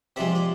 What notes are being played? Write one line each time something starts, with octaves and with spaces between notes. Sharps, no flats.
C3 F3 G#3 D5 E5
D5